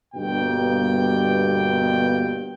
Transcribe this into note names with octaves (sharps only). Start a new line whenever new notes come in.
G1 G2 B2 A#3 G5